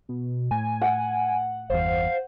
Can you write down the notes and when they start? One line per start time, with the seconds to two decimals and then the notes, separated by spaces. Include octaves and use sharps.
0.09 B2
0.51 A2 G#5
0.81 F#5
1.70 G1 E2 C5 F5